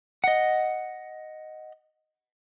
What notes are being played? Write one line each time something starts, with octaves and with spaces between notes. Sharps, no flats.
D#5 F#5